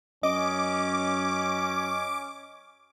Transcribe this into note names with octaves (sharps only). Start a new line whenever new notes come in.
F#2 C#4 D#5 D6